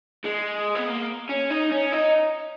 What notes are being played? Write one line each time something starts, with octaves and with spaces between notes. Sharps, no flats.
G#3
B3
A#3
C#4
D#4
C#4
D#4